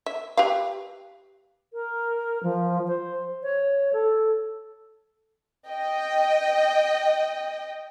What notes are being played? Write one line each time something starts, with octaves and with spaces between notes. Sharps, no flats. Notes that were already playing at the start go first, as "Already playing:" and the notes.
E5
G4 B4 F5
A#4
F3
C5
C#5
A4
D#5 G5